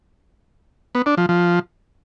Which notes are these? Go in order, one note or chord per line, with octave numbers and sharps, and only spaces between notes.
B3
D4
F3
F3